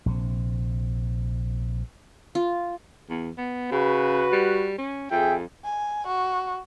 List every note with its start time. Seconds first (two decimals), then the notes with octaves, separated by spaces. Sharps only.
0.06 A#1 C3
2.35 F4
3.09 E2
3.38 B3
3.72 C#3 F#4 B4
4.33 G3
4.78 C#4
5.11 F2 G#4 E5 G5
5.65 G#5
6.07 F#4